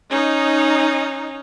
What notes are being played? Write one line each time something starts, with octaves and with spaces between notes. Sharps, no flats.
C#4 D#4